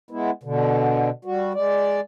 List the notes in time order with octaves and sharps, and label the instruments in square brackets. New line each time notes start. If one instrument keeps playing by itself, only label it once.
[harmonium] G#3 B3 E4
B2 D3
G3 F#4
G#3 D5